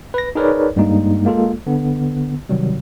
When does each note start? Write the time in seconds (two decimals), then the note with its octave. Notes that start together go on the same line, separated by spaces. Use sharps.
0.14 B4 A#6
0.35 D#4 G#4 A#4 B4 C#5 D5
0.76 G2 G3 G#3 A#3 D#4
1.25 G#3 A#3 F4 A4
1.66 D3 B3
2.49 C3 D#3 F#3 G3